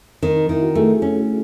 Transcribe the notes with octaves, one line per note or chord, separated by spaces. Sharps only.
D#3 C4
D#4
D#3 E4
F#4
A3 G#4
C#4